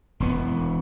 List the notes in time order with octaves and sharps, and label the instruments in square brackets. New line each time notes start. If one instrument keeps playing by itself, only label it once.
[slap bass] E1 B3